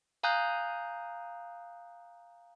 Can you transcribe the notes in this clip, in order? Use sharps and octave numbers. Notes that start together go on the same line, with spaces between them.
F5 G#5 A#5 D#6 F#6 G6